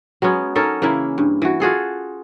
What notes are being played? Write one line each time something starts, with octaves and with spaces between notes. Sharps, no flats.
F#3 G#3 B3 C#4
C#4 D#4 A4 A#4
C#3 E3 A#3 E4
G2
E3 F#4
F4 F#4 G#4 A4